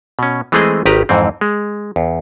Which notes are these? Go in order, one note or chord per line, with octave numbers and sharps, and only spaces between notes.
B2 C#4
E3 G#3 A3 C4 G#4 D#5
G#1 D#3 G4 B4 A#5
F2 G#2 E3 C4
G#3
E2